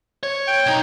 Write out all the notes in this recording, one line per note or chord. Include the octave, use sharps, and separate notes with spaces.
C#5
G5
B1 D#4